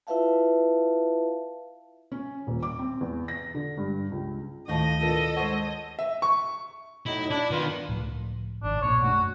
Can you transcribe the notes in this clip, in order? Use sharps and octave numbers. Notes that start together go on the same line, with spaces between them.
E4 F4 B4 E5 F5 A5
C#4
D#1
D6
C4
E2
A#6
D3
G2
C#2
D2 A2 D#3 F3 F#4 D#5 A5
B2 B3 D4 F4 A4 A#4
G#3 C5 C#5 D#5 F#5
E5
C#6
A2 F#3 D#4 E4
D4 E4
D#3 B3 F4
C#2 A2 F3
G#1 D4
B1 A#2 D4 C#5
F#2 A3 D4 F#4